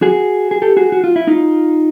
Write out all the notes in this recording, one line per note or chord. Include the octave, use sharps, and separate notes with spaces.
F#4 G#4
G#4
G4 A4
F#4 G#4
F#4
F4
E4
D#4 F4